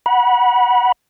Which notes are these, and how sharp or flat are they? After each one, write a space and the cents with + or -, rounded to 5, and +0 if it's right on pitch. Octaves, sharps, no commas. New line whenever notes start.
F#5 +0 B5 -30